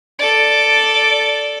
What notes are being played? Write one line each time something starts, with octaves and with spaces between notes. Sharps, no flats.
A4 D5